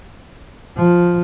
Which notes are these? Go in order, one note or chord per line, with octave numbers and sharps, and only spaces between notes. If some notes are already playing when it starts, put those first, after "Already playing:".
F3